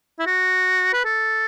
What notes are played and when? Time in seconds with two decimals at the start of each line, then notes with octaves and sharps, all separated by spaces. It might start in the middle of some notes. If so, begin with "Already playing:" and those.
0.19 E4
0.26 F#4
0.93 B4
1.05 A4